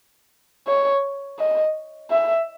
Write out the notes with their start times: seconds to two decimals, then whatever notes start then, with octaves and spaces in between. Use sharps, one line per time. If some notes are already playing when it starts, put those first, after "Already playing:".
0.68 C#5
1.39 D#5
2.11 E5